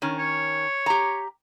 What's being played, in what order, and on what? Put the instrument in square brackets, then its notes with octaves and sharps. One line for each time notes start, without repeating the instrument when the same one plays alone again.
[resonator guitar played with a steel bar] D#3 C#4
[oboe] C#5
[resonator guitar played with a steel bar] G4 A#5